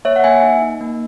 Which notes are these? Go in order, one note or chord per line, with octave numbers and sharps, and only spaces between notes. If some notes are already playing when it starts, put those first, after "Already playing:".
A#3 C#5 E5
F#5
A#3 E5 G#5
D#4
D#4
A#3